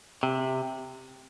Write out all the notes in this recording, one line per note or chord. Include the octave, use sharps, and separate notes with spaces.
C3